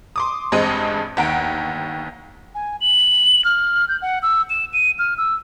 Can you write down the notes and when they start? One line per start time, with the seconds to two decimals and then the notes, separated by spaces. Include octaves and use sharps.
0.16 C6 D6 D#6
0.52 A1 G2 G#3 C4 D#5 D#7
1.17 G1 D#2 F#5 A#5 D7
2.55 G#5
2.81 F#7
3.45 F6
3.88 G6
4.02 F#5
4.23 E6
4.50 E7
4.73 D#7
4.99 F6
5.18 E6